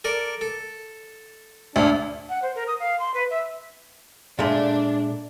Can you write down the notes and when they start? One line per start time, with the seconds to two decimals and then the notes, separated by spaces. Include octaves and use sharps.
0.04 A4 A#4 D5
0.41 A4
1.76 D2 D4
2.29 F#5
2.42 C5
2.55 A#4
2.68 D#6
2.80 F5
2.99 C6
3.14 B4
3.30 E5
4.39 A#2 G#3 A3 D4